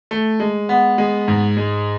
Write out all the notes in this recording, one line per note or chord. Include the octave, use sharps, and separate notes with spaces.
A3
G#3
B3
G#3
G#2
G#3